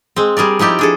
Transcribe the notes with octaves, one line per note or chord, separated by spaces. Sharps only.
G#3 C4
G3 G#4 A#4 D5
F3 D#4 E4 G4 D5
D4 G#4 A4